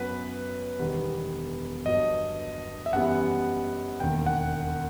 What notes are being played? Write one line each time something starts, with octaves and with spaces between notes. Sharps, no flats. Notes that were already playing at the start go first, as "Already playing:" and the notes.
Already playing: F#2 F#3 B3 B4
E1 E2 D#3 G3 B3
G1 G2 F#3 D#5
E5
F#2 E3 G3 B3 F#5
E1 D#2 D#3 G5
F#5